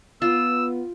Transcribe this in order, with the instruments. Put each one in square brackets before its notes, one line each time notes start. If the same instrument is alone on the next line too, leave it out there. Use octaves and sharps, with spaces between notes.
[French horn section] B3 [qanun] F4 [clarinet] E6